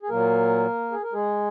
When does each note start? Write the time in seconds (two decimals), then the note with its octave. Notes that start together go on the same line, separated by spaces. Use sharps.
0.03 G#4
0.09 A#2 F#3 A#3 A#4
0.92 G#4
1.03 A#4
1.13 G#3 G#4